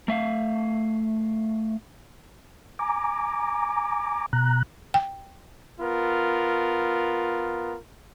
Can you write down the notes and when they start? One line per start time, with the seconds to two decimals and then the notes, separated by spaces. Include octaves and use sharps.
0.08 A3 E5 F5
2.79 G#5 A#5 D6
4.33 B2 A#5 F#6
4.94 G5
5.80 B3 F4 A#4